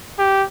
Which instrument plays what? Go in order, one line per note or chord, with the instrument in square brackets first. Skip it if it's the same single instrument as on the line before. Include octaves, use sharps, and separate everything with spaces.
[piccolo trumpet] G4